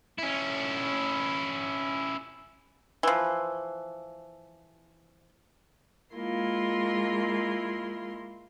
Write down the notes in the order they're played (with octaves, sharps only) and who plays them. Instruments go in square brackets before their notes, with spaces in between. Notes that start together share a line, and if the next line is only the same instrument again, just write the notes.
[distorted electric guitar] C#4 E4
[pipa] E3 F3
[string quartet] G#3 A#3 E4 F4 C6